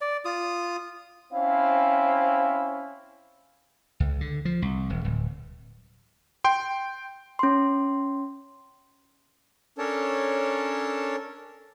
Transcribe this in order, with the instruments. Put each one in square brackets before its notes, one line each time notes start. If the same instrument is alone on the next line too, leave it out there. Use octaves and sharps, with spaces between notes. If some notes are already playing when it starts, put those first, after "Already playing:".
[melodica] D5
F4 D#6
[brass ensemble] C4 C#4 E4 C5 F5
[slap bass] C#2
D3
F3
C2
E1
D1
[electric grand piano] G5 C6
[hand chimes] C#4 C6
[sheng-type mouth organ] C#4 D4 A4 A#4 C#5 A5